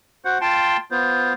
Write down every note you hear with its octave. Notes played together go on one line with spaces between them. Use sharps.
F#4 C5 F#5
F4 G5 A5 C6
B3 F4 C5